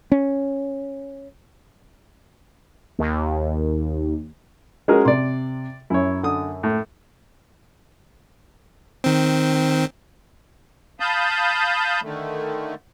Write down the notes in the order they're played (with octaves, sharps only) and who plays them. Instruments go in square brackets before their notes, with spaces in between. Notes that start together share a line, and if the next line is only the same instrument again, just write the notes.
[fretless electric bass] C#4
[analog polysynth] D#2
[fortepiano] G#3 G#4 [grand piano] C#4 F#4 A#4
[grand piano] C3 [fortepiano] D5 C6
[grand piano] F#2 [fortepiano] E4 C#5
[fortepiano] D3 D#6
A2
[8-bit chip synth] D#3 C4
[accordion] F5 A5 B5 D#6 G6
D3 D#3 A3